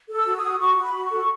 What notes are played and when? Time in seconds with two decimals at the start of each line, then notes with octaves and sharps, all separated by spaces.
0.09 A4
0.15 E6
0.26 F#4
0.37 D#6
0.43 F#4
0.60 F#4 C#6
0.77 F#4 B5
0.94 F#4
1.05 C#6
1.11 A4